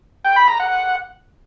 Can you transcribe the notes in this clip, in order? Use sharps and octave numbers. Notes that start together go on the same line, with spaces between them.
G5
B5
A#5
F#5